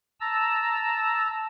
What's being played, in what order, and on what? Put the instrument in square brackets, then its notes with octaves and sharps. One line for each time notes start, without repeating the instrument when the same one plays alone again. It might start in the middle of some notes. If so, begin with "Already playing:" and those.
[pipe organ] A5 A#5 E6